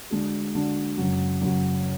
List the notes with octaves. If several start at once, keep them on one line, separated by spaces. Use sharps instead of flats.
D3 G#3 D4 F#4
D3 G#3 D4 F#4
F#2 C#3 F#3
F#2 C#3 F#3